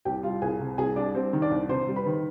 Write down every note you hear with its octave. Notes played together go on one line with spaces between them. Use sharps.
C2 G4 G5
G3 F4 F5
C2 G#4 G#5
C3
C2 G#4 G#5
G3 D4 D5
G3 C4 C5
D#3
D4 D5
C2
C3 C5 C6
G3
B4 B5
D#3